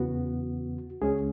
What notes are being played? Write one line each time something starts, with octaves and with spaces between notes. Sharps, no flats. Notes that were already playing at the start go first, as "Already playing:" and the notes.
Already playing: E2 C#3 E3 B3 F#4
C#2 C#3 G#3 C#4 G#4